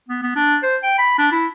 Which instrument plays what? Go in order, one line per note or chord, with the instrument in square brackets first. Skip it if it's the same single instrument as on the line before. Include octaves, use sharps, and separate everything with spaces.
[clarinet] B3
B3
D4
C5
G5
B5
D4
E4